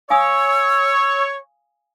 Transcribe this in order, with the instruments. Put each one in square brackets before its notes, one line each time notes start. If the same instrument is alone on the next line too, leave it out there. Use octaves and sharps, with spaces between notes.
[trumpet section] C#5 [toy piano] F5 G#5 D#6 [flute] E6